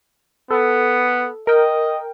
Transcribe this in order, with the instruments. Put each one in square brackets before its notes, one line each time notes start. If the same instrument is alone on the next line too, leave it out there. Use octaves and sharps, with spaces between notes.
[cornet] B3 [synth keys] A4
[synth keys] A#4 G5 [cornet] D#5